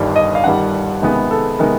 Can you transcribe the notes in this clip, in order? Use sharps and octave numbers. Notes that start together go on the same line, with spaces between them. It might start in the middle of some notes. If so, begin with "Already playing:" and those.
Already playing: G1 G2 D#3 G3
D#5
F5
G1 G2 D#3 G3 F#5
C#2 C3 D#3 G#3 B3
A4
C3 D#3 G#3 B3 A#4